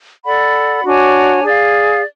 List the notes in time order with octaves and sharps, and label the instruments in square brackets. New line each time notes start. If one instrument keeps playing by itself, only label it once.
[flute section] A4 D5 F#5 B5
D4 F#4 C#5 G#5
G#4 D5 F5